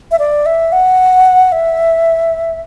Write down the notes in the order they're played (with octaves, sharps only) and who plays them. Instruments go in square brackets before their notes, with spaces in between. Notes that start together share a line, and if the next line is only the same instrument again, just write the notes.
[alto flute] E5
D5
E5
F#5
E5